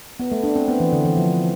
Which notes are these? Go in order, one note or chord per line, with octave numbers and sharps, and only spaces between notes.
B3
A3
D4
C4
B3
E3
D3
E3
F3